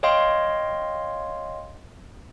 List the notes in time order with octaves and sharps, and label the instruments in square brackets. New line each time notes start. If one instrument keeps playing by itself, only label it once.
[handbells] C#5 D#5 F5 G5 C6